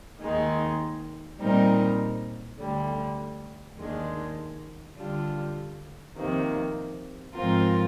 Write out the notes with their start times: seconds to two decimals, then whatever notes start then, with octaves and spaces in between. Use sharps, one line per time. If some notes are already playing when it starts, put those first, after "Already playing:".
0.21 D#2 D#3 G#3 D#4
1.40 A#2 G3 C4 D#4 A#4
2.59 D2 D3 G3
3.78 D#2 D#3 G#3 D4
4.97 D3 G3 D4 F4
6.16 F2 C3 D#3 A#3
7.35 G#2 F3 C4 F4 A#4